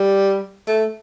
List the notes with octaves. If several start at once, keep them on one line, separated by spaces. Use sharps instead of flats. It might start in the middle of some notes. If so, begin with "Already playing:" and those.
Already playing: G3
A3